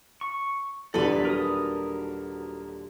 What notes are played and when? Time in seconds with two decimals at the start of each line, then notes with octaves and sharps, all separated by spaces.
0.21 C#6
0.94 D#1 E2 D3 F3 A4 B4 D5
1.25 F#3 A#4 D#6